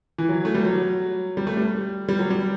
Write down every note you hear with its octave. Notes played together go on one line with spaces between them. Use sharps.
E3
F#3
A3
G3
F#3
G3
A3
G3
G3
F#3
G3